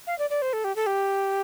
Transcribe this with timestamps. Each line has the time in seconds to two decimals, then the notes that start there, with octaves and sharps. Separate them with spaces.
0.07 F5
0.19 D5
0.30 D5
0.42 C5
0.53 A4
0.64 G4
0.76 A4
0.86 G4